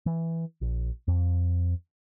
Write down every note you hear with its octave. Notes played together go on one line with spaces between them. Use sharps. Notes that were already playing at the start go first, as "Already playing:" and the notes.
E3
A#1
F2